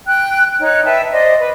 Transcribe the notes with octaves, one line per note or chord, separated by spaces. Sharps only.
G5 F#6
D#4 C#5 F#6
B4 E5 G5 A5
C5 D5 D#5
B4